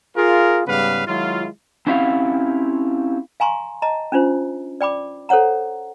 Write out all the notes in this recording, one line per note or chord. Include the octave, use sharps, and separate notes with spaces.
F4 G#4 A#4
G#2 C#3 G3 B3 B4 F5
D#3 F#3 G#3 E4 F4
C4 C#4 E4 G4 F5 F#5
F5 G#5 A#5 C6 C#6
D#5 A5 A#5
C#4 D4 F4 C5
D5 G5 B5 D6
A4 C5 C#5 F#5 A#5